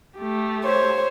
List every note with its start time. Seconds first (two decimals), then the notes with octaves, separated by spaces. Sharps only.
0.18 A3 G4
0.64 C5 C#5